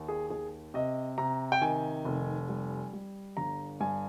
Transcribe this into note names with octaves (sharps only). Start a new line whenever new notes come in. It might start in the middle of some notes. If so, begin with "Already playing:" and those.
Already playing: D#2
G#4
D#2 G#4
C3 D#5
C3 A#5
G5
D#3 G#5
F1
G3
G3
G1 A#5
G2 G#5